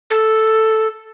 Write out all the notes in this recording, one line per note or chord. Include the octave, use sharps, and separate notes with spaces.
A4